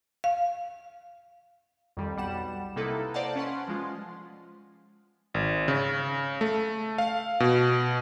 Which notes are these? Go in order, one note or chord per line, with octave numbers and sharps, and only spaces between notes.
F5
F2 D#3 G3
B1 G3 F#5 E7
C3 A#3 D#4 E4 A4 B4
C5 D5 D#5 F5 F#5 A5
C#4 B4 F#5 C6
F3 G#3 F4
G#1
C#3
A3
F5
B2